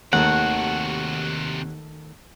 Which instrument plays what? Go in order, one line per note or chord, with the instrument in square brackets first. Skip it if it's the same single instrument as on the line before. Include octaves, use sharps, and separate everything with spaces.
[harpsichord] D#2 [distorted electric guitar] C3 F#4 [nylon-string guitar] D#3 A3 A5 [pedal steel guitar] F#5